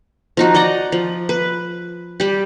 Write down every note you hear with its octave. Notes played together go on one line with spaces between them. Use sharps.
F3 D#4 F#4
D5 D#5 F#5 A#5
F3
B4
G3 G4